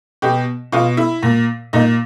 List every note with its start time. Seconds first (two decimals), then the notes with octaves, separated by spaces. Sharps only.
0.22 B2 G4
0.72 B2 F4
0.97 E4
1.23 A#2
1.73 A#2 D#4